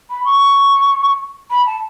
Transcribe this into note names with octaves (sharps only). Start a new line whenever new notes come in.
B5
C#6
B5
A5